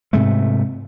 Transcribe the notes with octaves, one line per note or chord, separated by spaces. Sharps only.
G#2 C3 G#3 A3